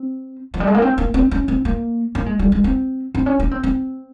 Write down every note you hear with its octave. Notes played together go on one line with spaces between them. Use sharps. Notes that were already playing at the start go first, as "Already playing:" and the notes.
Already playing: C4
F3
G3
G#3
A#3
C4
A#3
C4
C#4
C4
A#3
A#3
G#3
G3
G#3
C4
C4
C#4
C#4
C4
C4